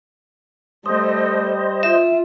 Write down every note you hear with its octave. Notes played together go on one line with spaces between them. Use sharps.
G3 A3 C5 D#5
F4 E5